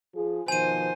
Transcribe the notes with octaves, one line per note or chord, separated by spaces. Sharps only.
F3 G#4
B2 D#3 F3 C5 G#5 D#7